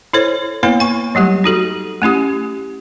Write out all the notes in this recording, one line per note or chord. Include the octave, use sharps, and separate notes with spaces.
E4 A4 C5 C#5
A#3 B3 E4 B4 C#5
G#5 C#6
F#3 G3 A3 G4
D#4 F#4 A4
A3 C#4 E4 G4